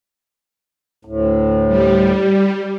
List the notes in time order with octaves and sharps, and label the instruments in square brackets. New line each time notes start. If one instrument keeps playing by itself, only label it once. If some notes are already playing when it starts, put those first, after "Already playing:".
[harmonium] D2 A2
[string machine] G3